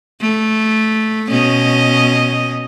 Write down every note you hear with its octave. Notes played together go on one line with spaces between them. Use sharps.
A3
B2 C#4 D#5